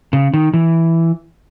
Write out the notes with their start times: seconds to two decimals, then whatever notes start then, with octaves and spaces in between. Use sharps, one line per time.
0.13 C#3
0.33 D#3
0.54 E3